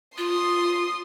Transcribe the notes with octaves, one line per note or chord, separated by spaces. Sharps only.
F4 C6 D#6